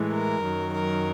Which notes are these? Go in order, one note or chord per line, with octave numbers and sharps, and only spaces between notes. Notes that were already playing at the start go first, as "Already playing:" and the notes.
Already playing: A2 E3 G#3
A#4
F#2 D#3 F#3
A#4